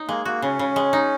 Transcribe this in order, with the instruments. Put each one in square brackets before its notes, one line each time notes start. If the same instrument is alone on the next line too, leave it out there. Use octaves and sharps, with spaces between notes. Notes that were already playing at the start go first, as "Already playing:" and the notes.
Already playing: [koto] D#4
[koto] G#3 [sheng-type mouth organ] A#3
[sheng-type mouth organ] A#3 [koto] F#4
[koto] C#3 [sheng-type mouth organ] C#4
[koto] C#3
G#3
D#4